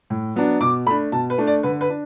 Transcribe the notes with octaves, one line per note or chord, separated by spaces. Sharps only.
A2
F#3 B3 D4
B2 D6
A3 D4 B5
B2 A5
B4
A3 D4
D5
D3 B4
B4
D4